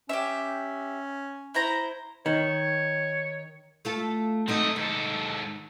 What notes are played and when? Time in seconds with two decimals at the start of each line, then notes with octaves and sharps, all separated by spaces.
0.09 C#4 G4 E5
1.54 E4 C5 A#5
2.26 D#3 C#5
3.85 A3 F4 A4
4.48 F#3 A3 C4 D#4 D#5
4.76 G#2 D#3 A4